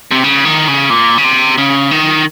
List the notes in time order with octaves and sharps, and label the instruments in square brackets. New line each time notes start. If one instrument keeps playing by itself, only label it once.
[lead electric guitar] C3
C#3
D#3
C#3
A#2
C#3
C3
C#3
D#3